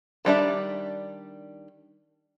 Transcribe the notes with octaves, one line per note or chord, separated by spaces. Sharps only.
D#3 G3 D4 E5